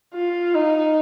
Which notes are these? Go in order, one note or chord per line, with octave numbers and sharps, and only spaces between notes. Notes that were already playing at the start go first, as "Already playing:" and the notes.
F4
D#4